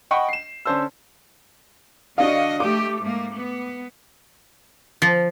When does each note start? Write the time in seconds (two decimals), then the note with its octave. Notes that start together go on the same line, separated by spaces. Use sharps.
0.11 D#5 F#5 G5 B5 C#6
0.29 C7 E7
0.65 D3 C#4 D4 C5 A5 E6
2.18 D3 D4 F#4 D#5 F5
2.60 A3 G4 D6
3.01 G#2 A3 A#3
3.34 B3
5.02 F3